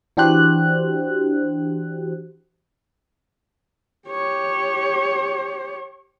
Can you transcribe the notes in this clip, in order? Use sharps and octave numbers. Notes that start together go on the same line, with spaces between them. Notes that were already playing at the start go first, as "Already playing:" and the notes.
E3 D4 F#4 G4 C5 F#6
G4 C#5